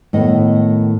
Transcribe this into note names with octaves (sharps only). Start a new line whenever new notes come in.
A2 D#3 B3 D#5